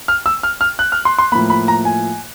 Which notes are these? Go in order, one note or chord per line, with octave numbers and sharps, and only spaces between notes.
F6
E6
F6
F6
F#6
F6
C6
C6
A2 F3 A#3 B5
B5
A#5
G#5